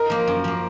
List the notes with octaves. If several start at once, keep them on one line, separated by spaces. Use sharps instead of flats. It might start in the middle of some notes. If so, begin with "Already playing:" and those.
Already playing: D#4 A#4
F3 A#3
F#2
F3 A#3